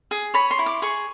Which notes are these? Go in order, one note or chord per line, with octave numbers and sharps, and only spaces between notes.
G#4
C#5 B5
C6
E4
D6
G#4 C#6